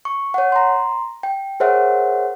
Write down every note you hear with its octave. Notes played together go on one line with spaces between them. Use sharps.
C#6
C#5 F#5
A#5 C6
G5
G#4 A#4 C5 C#5 E5 F#5